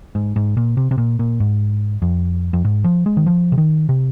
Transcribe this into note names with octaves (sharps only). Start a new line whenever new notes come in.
G#2
G#2
A#2
C3
C3
A#2
A#2
G#2
F2
F2
G#2
F3
G#3
D#3
F3
C3
D#3
C3